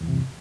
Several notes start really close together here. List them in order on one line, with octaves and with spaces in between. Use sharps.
E2 E3 G2 C3